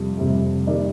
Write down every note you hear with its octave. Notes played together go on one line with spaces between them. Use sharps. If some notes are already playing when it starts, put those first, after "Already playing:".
Already playing: F2 C3 G3
F2 C3 G3
D#3 G3 D5